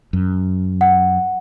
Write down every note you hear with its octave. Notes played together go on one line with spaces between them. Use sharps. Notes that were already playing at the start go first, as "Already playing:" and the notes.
F#2
F#5